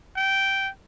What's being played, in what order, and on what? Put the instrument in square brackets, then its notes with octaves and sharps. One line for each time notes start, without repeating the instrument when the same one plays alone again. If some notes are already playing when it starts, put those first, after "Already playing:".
[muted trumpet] G5